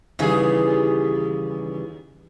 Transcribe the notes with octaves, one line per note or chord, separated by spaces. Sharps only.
D#2 C#3 E3 G3 G#4